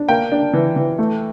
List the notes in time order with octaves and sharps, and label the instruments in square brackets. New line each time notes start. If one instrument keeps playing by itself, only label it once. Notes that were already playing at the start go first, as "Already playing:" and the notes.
Already playing: [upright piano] D4
A#3 G5
D4
E3
E3
A3